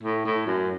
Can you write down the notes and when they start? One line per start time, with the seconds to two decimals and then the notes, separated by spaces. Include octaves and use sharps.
0.03 A2
0.25 A2
0.46 F#2